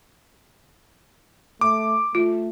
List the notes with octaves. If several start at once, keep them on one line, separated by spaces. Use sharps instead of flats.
A3 D6
A3 F4